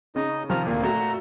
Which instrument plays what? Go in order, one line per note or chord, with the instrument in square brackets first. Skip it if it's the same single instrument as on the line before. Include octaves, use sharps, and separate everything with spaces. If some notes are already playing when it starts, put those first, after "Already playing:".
[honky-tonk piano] C#3 [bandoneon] D#4 D#5
[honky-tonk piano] C3 D#3 [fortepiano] F3 [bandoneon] A#5 F6
[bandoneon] D2 A#3 [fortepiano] A#2
[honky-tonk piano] A3 F#4 [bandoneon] A#5